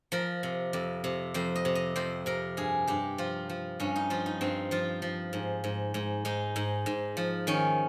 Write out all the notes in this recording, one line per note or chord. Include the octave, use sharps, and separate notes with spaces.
F3 A#4
C3
F2
C3
F2 C5
D#5
C3
D#5
F2 C5
C3 A#4
G2 G#4
G2 G4
F3 F4
F3
G2 C#4
D#4
F3 F4
D#4
G2 C4
F3 F4
F3
G#2
G#2
G#2
G#2 D#4
G#2
G#2
F3
D#3 C#4